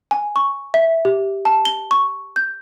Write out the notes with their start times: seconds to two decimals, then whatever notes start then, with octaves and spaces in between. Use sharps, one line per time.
0.11 G#5
0.36 C#6
0.74 E5
1.05 G4
1.45 A5
1.65 G7
1.91 C#6
2.36 G6